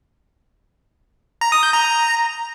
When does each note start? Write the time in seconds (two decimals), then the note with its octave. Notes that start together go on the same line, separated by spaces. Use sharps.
1.41 A#5
1.52 D#6
1.63 G6
1.74 A#5